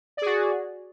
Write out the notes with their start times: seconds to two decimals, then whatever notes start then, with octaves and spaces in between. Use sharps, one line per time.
0.17 D5
0.22 G#4
0.26 F#4